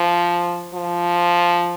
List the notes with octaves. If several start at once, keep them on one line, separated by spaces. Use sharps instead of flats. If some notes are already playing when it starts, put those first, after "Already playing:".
Already playing: F3
F3